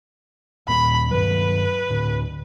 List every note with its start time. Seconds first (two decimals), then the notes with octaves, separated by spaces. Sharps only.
0.68 D#2 A#2 A#3 B5
1.11 G2 D#3 F#3 B4
1.90 D2 A2